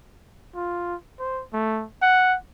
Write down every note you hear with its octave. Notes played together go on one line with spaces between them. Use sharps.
F4
C5
A3
F#5